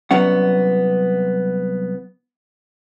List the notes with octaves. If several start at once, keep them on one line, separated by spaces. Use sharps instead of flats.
C2 F#3 B3 C#4 F#5